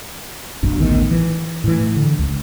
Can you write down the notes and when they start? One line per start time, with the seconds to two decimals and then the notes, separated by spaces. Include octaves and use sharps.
0.63 A#1 F#2 D4
0.78 A1 D2 D#3 B3
1.11 E3
1.64 A2 E3
1.96 D3
2.19 C#2